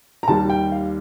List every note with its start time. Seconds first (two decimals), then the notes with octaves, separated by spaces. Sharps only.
0.23 A#5
0.28 D#2 D#3 G3 A5
0.50 G5
0.72 F5